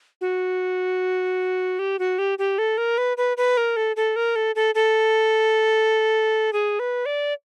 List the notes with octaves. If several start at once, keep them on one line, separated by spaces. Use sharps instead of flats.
F#4
G4
F#4
G4
G4
A4
A#4
B4
B4
B4
A#4
A4
A4
A#4
A4
A4
A4
G#4
B4
D5